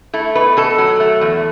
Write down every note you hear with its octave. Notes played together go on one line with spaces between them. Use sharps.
A3 E4
B2 B4
B2 A4
F#3
A3
E2